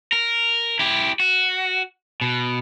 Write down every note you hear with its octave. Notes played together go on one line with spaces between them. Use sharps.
A#4
E4 G4
F#4
B2